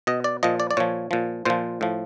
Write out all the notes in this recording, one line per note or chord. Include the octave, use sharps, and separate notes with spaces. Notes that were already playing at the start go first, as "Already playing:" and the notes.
B2 D#5
D5
A#2 F3 D#5
D5
D5
A#2 F3 C#5
A#2 F3
A#2 F3 C5
A2 F3